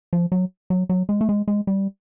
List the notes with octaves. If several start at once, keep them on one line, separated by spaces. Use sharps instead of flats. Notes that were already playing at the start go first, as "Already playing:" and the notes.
F3
F#3
F#3
F#3
G#3
A3
G#3
G#3
G3